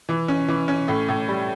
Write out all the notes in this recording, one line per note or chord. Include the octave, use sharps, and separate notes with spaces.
E3
C#4
E3
C#4
A2
A2
G3